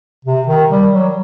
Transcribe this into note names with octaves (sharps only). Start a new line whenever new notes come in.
C3
D#3
G3
F#3